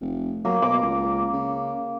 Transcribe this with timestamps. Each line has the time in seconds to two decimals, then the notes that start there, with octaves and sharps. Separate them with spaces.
0.01 F1
0.45 F#3 A#3
0.62 B2 D6
0.82 C#2
1.33 C#3